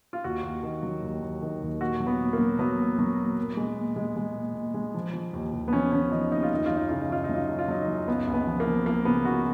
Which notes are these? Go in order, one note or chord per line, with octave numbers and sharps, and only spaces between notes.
F4
D#2 F#4
D#2
D#3
F#3
D#2
D#2
D#3
D#2
A#2 F#4
F#3
B3
A#2
A#3
F#3
F#3 B3
A#2
F#3
A#2
A#2
G#3
A#2
G#3
G#3
A#2
A#2
G#3
F3
F3
D#2
D#2
B3
F3 C#4
F3 C#4
F3 D#4
D#2 D#4
F4
F#2 D#4
F#2 F4
D#4
C#3 F4
D#4
F#2 F4
D#4
F#3
F4
F#2 D#4
F4
F#3 D#4
F#2
C#2 B3
C#2
B3
F3
A#3
F3
F3 A#3
C#3 B3
C#3 F#4